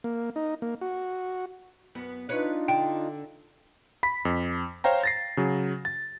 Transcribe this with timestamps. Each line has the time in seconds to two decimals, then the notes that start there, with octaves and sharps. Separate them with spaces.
0.04 A#3
0.36 D#4
0.62 A#3
0.81 F#4
1.95 F#2 B3
2.29 D4 D#4 F4 B4 C#5
2.68 D3 G5
4.03 B5 B6
4.25 F2
4.84 C5 C#5 F5 G5 A#5
5.04 A6 A#6 C7
5.37 C#3 F#3
5.85 A6